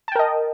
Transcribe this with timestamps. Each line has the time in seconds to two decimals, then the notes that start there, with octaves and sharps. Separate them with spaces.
0.08 A5
0.12 G5
0.16 A#4
0.19 D#5